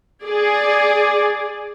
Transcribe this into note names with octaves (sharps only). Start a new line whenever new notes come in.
G#4 D5